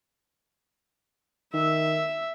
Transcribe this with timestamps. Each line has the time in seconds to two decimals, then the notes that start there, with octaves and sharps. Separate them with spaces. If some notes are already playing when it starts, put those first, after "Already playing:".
1.53 D#3 E5